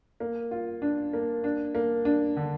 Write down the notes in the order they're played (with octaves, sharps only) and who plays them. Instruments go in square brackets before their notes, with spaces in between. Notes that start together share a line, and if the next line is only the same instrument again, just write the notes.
[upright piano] A#3
F4
D4
A#3
D4
A#3
D4
D3